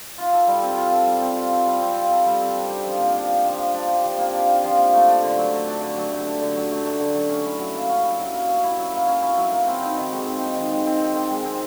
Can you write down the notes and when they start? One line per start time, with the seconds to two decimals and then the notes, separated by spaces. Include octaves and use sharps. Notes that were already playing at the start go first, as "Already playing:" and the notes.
0.18 F4
0.32 A4
0.47 G3
0.63 C4
0.77 F4
0.92 A4
1.07 G3
1.22 C4
1.36 F4
1.51 A4
1.66 G3
1.81 C4
1.96 F4
2.11 A4
2.26 G3
2.40 C4
2.55 D4
2.70 G4
2.85 F3
3.00 A#3
3.15 D4
3.30 G4
3.45 F3
3.59 A#3
3.74 D4
3.88 G4
4.04 F3
4.18 A#3
4.33 D4
4.48 G4
4.63 F3
4.78 A#3
4.93 A3
5.07 D4
5.22 D3
5.37 F#3
5.52 A3
5.67 D4
5.81 D3
5.97 F#3
6.11 A3
6.26 D4
6.41 D3
6.55 F#3
6.71 A3
6.85 D4
7.00 D3
7.15 F#3
7.30 C#4
7.45 E4
7.59 F#3
7.74 A#3
7.89 C#4
8.04 E4
8.19 F#3
8.34 A#3
8.49 C#4
8.64 E4
8.78 F#3
8.93 A#3
9.08 C#4
9.22 E4
9.37 F#3
9.52 A#3
9.67 C4
9.82 D#4
9.97 D#3
10.12 G#3
10.26 C4
10.41 D#4
10.56 D#3
10.71 G#3
10.86 C4
11.00 D#4
11.15 D#3
11.30 G#3
11.45 C4